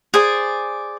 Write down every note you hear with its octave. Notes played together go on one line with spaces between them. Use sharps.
G#4 C5 D5